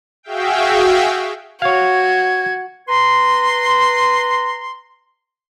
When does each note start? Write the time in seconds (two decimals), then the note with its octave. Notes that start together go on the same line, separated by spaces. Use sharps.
0.23 F#4 G#4 E5 F5 G5
1.62 F#4 C#5 F5 G#6
2.89 B4 A#5 C6